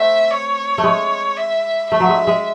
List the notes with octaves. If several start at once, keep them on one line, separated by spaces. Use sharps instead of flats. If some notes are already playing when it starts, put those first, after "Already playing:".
Already playing: A3 C4 E5
C#5
A3
G#3
E5
A3 E5
F#3
G#3
G#3